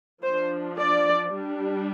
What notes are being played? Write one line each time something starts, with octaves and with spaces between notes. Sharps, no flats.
F3 D4 C5
D5
G3 D4